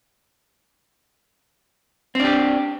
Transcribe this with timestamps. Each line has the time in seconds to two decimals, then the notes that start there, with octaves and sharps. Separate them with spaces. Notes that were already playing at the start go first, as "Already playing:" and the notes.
2.15 C4
2.20 D4
2.24 G4